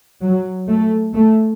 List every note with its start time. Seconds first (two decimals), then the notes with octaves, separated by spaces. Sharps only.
0.23 F#3
0.69 A3
1.15 A3